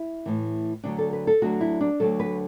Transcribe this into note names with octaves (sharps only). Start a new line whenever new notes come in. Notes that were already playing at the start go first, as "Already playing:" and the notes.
Already playing: E4
A2 E3
D2 D3 F#3 D4
A4
B4
A4
D2 D3 F#3 F#4
E4
D4
D2 D3 F#3 A4
B4